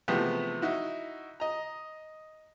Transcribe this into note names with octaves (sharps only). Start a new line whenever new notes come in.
C3 E3 F3 G#3 A3 B3
D#4 E4 F#4
D#5 A#5